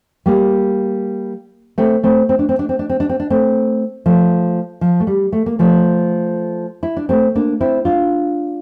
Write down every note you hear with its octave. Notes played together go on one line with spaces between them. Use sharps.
G3 A#3
A3 C4
A3 C4
C4
D4
C4
D4
C4
D4
C4
D4
C4
D4
A3 C4
F3 A3
F3
A3
G3
A3
A#3
F3 A3
E4
D4
A3 C4
A#3 D4
C4 E4
D4 F4